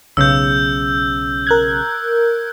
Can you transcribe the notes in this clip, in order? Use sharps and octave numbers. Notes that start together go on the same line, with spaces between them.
B1 C#3 E6 G6
A#4 F#6 G#6